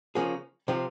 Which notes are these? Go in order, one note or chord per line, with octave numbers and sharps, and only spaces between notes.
C#3 F3 A#3 C#4 G#4
C3 F3 C4 F4